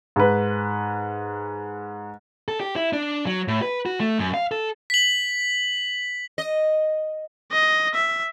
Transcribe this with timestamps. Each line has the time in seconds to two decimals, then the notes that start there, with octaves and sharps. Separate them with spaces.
0.16 G#2 B4
2.48 A4
2.61 G4
2.76 E4
2.93 D4
3.27 F#3
3.48 A2
3.62 B4
3.86 F#4
4.00 A3
4.18 F#2
4.34 F5
4.51 A4
4.90 B6 F#7
6.38 D#5
7.52 D#5
7.95 E5